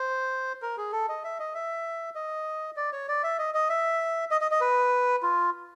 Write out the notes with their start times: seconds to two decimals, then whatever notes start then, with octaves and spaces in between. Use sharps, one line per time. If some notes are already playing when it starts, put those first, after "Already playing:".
Already playing: C5
0.62 A#4
0.77 G#4
0.92 A4
1.09 D#5
1.24 E5
1.40 D#5
1.54 E5
2.15 D#5
2.77 D5
2.93 C#5
3.08 D5
3.23 E5
3.39 D#5
3.54 D#5
3.69 E5
4.31 D#5
4.41 D#5
4.51 D#5
4.61 B4
5.23 F4